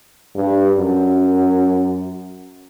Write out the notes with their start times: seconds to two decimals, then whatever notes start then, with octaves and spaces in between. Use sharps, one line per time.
0.35 G2
0.78 F#2